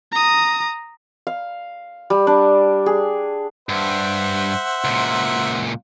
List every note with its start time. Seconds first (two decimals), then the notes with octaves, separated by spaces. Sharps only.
0.12 A#5 D#6
1.27 F5
2.10 G3
2.27 D4
2.86 G#4
3.69 G2 C5 E5 F#5
4.84 C#2 A#2